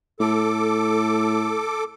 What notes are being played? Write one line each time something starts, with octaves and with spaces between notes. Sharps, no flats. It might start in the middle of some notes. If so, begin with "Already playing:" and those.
A2 A4 D6